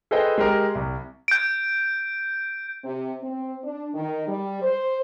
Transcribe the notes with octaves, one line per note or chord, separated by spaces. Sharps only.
G#4 A4 B4 C5 D#5 G5
G#3 G4 A#4
C2
G6 D7
C3
C4
D4
D#3
G3
C5